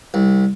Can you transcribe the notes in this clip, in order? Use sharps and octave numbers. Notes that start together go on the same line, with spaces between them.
C2